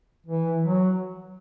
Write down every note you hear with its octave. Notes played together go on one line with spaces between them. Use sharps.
E3
F#3